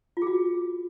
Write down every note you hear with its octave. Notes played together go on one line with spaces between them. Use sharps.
F4
G#4
F#4